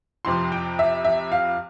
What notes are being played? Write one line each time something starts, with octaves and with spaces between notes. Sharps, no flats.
F2 C3 F3 C6
G5
E5
E5
F5